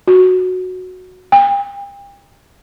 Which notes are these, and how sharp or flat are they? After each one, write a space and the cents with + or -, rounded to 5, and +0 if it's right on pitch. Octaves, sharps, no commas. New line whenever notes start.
F#4 -5
G5 +40